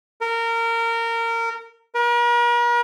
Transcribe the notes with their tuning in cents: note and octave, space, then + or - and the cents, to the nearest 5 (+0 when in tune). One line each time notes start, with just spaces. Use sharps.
A#4 -20
A#4 +45